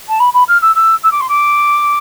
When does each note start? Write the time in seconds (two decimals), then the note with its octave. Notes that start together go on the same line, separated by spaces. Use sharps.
0.08 A5
0.19 B5
0.33 B5
0.48 F6
0.62 E6
0.75 E6
1.03 E6
1.11 D6
1.20 C6
1.28 D6